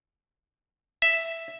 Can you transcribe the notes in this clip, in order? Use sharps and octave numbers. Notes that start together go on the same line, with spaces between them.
E5